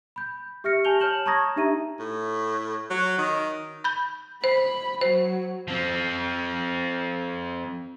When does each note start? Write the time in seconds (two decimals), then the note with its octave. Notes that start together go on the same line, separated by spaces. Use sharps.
0.16 B5 G6
0.64 G4 E5 F6 A#6 C#7
0.85 G4 G#5 A5 G6 F7 G7
1.00 C#5 A5 F6 G6 E7 F#7
1.26 A5 A#5 C#6 D#6 G#6 A#6
1.56 D4 D#4 G4 E5 A#5 D#7
1.99 A2
2.90 F#3
3.18 D#3
3.84 B5 G6
4.44 C5 B5
5.01 F#3 C5
5.68 F3 C4